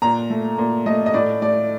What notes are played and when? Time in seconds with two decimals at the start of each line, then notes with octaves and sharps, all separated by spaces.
0.02 A#2 A#5
0.30 A3
0.58 A#2
0.86 A3 D#5
1.06 D#5
1.14 A2 D5
1.42 A3 D5